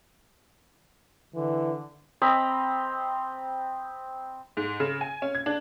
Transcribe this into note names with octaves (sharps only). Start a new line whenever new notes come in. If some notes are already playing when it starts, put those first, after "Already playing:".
D3 E3
C4 D#5 A#5 B5
G#2
C#3
G#5
C#4
G#6
D4